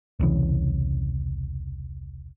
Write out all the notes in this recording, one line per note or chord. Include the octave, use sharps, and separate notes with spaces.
E1 C2 C#3 E3